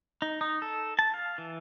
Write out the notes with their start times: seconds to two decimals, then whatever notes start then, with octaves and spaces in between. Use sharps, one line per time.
0.22 D#4
0.41 D#4
0.62 A4
0.99 A5
1.14 F5
1.38 E3